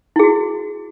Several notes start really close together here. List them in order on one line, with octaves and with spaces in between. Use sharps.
E4 G#4 F#4